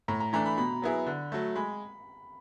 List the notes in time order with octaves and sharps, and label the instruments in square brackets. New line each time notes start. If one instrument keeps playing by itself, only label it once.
[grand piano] A2 [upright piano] A#5
[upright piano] A#5
[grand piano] E3 A3 D4 [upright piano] A#5
[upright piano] B5
[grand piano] B2 [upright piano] B5
[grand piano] F#3 B3 E4 G#4
D3
F#3 A3
[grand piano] G#3 [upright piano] B5